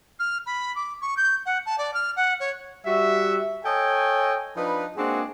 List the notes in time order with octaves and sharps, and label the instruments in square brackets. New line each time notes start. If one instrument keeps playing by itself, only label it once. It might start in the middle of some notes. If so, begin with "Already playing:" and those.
[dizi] F6
B5
D6
C#6
G6
F#5
A5
D5
F6
F#5
C#5
[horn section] G3 F#4 E5
A4 C#5 D#5 G5 G#5
F3 D4 D#4 B4
G#3 A#3 C4 D4 F#4 G#4